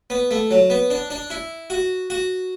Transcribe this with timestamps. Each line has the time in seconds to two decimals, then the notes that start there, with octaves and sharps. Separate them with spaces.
0.10 B3
0.31 A3
0.51 F#3
0.70 B3
0.90 D4
1.10 D4
1.30 E4
1.70 F#4
2.10 F#4